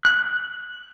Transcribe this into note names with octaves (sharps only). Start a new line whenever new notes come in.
F#6